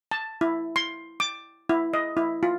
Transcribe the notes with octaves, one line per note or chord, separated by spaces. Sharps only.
A5
E4
C6
D6
E4
D#5
E4
F4